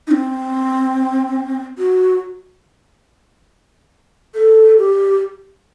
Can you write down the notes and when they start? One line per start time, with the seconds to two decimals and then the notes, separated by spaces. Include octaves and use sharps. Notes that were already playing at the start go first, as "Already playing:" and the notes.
0.07 D#4
0.11 C4
1.78 F#4
4.35 A4
4.78 G4